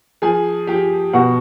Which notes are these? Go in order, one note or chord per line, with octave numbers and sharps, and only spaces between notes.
F3 G#4 G#5
F3 G4 G5
B2 F#4 F#5